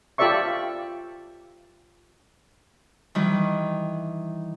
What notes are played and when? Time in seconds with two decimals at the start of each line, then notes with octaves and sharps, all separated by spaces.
0.18 F4 G4 A4 D5 E5 C#6
3.15 D#3 E3 G3